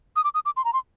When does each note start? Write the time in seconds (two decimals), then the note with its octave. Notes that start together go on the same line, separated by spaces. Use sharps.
0.16 D#6
0.24 D6
0.34 D#6
0.45 D6
0.57 C6
0.65 A#5
0.73 C6